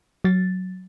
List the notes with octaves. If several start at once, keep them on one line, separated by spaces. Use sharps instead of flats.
F#3 A6